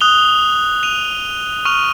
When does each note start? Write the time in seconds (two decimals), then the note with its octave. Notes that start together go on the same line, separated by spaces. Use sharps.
0.01 D#6 F#6 F7 G7
0.83 D#7 F7
1.65 C#6 F6 D#7 F7